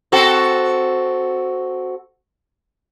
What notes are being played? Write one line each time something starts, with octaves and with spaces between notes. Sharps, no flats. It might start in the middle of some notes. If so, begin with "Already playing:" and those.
C4 F#4 A4